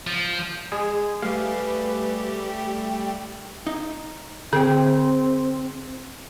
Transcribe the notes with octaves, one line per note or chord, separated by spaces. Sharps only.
F3
G#3 G#4
G3 A3 G4 G#4 B4 F5
G5
D#4
D3 C4 G#4 G5